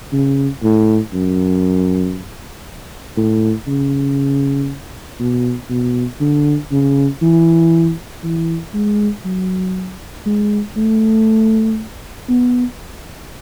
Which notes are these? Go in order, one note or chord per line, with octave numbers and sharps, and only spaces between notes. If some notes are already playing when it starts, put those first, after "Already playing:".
C#3
A2
F#2
A2
C#3
B2
B2
D3
C#3
E3
E3
G#3
F#3
G#3
A3
B3